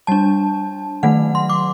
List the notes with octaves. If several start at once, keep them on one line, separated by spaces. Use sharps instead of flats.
G3 D4 A5
D#3 F#3 A3 F#5
C6
D6